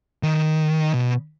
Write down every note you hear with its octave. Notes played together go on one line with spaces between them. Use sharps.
D#3
B2